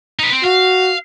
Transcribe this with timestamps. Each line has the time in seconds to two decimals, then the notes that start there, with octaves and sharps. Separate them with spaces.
0.19 D#4 B4
0.32 C4
0.44 F#4 F5